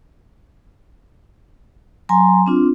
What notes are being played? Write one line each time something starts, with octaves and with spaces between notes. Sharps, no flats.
F#3 G#5 A#5 C6
C4 D4 F4